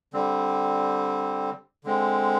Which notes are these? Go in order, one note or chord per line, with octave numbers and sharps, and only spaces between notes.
D3 G3 C4
D3 G#3 C4